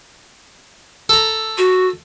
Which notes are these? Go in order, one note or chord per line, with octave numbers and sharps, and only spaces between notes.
A4 A#5
F#4